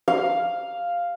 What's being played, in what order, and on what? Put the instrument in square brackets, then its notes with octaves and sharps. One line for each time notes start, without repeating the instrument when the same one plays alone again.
[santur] F5